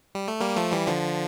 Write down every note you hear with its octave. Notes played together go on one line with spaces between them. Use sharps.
G3
A3
G3 A#3
F3 A3
E3 G3
D3 F3